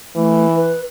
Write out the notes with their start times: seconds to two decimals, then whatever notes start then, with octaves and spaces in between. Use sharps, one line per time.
0.16 E3 A3
0.55 B4